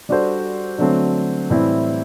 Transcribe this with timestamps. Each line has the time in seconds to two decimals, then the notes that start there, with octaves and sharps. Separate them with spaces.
0.09 G3 D4 F#4 A4 C5
0.78 D3 F#3 A3 C4
1.50 A2 E3 G3 C4 E4